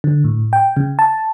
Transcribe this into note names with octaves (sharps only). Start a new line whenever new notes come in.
D3
A2
G5
C#3
A5